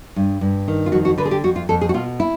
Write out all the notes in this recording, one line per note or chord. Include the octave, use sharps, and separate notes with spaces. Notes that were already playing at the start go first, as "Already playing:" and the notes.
G2
G2
D#3
F4
F2 F#4
F#4
D3 B4
G#4
G4
F2 F#4
F4
F2 A4
G#4
F#4
B2 F4
E4